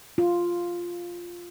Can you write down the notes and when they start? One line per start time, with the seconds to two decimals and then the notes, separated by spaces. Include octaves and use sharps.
0.18 F4